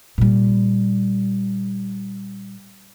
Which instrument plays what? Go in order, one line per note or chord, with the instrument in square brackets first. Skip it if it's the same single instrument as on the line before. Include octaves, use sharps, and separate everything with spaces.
[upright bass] A#2 G3